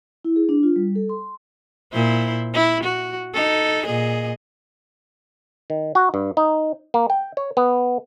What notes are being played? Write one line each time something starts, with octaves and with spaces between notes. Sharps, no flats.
E4
G#4
D4
F4
G3
A4
C6
A#2 E4 C5
E4
F#4
D#4 A4
A#2 G#4 D#5
D#3
F#4
G2
D#4
A#3
G5
C#5
B3